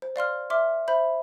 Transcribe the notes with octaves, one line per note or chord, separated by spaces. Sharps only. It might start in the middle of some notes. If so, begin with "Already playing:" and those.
C5
D5 F5 C6 F6
E5 C6 D6 F6
C5 E5 B5 G6